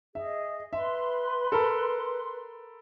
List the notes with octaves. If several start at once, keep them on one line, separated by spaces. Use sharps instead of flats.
G#4 D#5 E5
B4 E5 C6
A4 A#4 B5